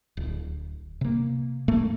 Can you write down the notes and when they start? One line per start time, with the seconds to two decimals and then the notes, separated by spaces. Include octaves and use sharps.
0.17 D1
1.01 C3 A#3
1.68 A2 A3 A#3